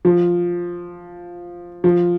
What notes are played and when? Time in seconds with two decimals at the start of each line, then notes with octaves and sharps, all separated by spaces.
0.05 F3
1.84 F3